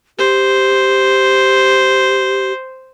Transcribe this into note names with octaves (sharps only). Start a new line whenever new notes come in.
G4 C5